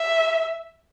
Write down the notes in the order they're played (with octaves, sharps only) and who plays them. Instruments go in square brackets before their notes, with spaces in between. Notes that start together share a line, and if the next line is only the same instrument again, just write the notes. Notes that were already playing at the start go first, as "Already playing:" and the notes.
Already playing: [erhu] E5